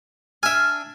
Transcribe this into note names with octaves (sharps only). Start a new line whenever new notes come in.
D4 E5 G#5 F6